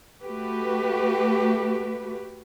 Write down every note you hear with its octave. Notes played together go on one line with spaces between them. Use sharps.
A3 F#4 G4 B4